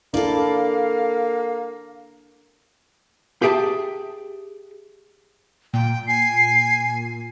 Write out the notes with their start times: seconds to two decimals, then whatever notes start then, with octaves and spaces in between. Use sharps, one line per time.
0.14 A#3 D4 E4 A4 D5 F5
3.42 G4 G#4 E5 G5 A5
5.74 A#2 G5
6.07 G#5 C7